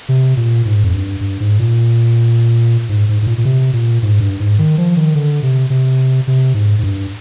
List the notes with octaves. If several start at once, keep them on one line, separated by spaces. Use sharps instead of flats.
C3
A#2
G#2
F2
G2
G2
G#2
A#2
G#2
G#2
G#2
A#2
A#2
C3
A#2
G#2
G2
G#2
D#3
F3
D#3
D3
C3
C3
C3
G#2
G#2
G2